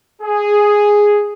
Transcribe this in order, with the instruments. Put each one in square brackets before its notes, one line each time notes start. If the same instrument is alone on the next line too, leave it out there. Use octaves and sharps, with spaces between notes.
[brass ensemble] G#4